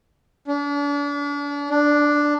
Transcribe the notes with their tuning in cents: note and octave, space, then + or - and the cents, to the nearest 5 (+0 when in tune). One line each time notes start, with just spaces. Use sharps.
D4 -40
D4 +0